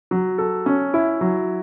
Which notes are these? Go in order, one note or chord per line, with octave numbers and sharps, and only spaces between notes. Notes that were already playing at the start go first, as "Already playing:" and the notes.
F#3
A4
C#4
E4
F#3